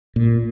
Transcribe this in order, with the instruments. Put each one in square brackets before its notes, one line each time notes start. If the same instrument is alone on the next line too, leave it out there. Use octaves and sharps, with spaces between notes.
[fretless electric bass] A#2